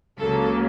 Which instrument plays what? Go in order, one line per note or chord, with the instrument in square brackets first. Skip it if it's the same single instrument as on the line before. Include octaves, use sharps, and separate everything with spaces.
[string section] C#2 C#3 F#3 A#3 A4